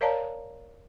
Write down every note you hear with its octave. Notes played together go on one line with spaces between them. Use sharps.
A#4 C#5 D5 F5 A5 A#5